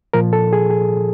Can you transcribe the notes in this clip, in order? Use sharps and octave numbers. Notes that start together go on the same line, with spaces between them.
A#2 F3 A#4
A4
G#4
G#4